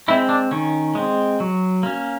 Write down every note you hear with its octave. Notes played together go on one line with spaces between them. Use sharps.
G#3 C4 E4
D4
D#3 C#4
G#3 C4
F#3
A#3 C#4